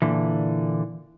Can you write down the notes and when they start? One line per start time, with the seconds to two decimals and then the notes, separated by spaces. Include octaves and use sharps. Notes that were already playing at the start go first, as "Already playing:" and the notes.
0.02 A#2 D3 E3